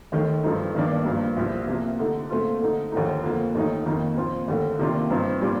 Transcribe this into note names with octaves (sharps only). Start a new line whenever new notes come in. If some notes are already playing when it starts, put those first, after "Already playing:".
D#2 D#3 A3
G2 F3 A3 D#4
G2 D#3 A#3 D4
G2 F3 A#3
C2 A#2 F3
C3 F3 A#3
D3 A3 D#4
A#2 A3 C4 F4
D3 A3 D#4
D#2 D3 F3 A3 D#4
F2 D3 F3 A#3
D#2 D#3 A3 D#4
F2 D#3 A#3 D#4
A#2 F3 C4 F4
D#2 D3 A3
C3 D#3 A#3 D4 F4
G2 F3 C4 D#4
A#2 G3 D4 F4